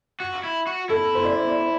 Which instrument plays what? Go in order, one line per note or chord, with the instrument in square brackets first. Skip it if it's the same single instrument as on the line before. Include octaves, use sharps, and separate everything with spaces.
[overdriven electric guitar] F#4
E4
F#4
[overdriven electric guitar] E4 [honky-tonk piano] A4
[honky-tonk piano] C5
D5